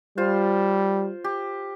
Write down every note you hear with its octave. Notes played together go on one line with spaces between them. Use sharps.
G3 F4 C5
G4